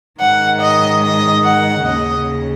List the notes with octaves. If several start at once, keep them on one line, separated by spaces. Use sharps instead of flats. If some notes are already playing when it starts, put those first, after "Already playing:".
G#2 D#3 F#5
D#5
D#5
F#5
D#2 C#3 D#5